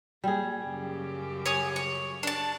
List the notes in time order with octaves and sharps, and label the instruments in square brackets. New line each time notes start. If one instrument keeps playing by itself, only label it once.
[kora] G3 G#4 [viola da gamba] A#3
[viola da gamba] F#2 C#3 G4
[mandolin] C#5 G#5 D#6
C#5
D4 A5